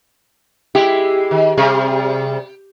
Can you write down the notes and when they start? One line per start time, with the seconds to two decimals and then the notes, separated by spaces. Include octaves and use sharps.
0.75 G#3 E4 G4
1.31 D#3
1.57 C3 G3 G#4